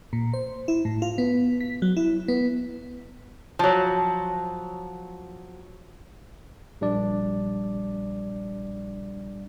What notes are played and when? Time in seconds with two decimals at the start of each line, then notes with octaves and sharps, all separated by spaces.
0.13 A#2
0.34 C5
0.68 E4
0.85 A2
1.02 F4
1.18 B3
1.60 B6
1.82 F#3
1.97 E4
2.28 B3
3.59 F3 F#3
6.81 A#1 G3 D4 D5